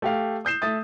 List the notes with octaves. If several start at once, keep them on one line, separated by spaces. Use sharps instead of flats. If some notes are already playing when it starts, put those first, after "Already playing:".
A3 G4 F5
D#6 G6 C7 E7
A3 E5 D#6 A6